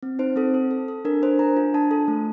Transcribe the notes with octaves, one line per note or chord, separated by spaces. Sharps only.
C4
D#4 C5
C4 A4
A4
A4
A4
D4 A#4
D4 C5
D4 A#5
F4
D4 A5
A4
A3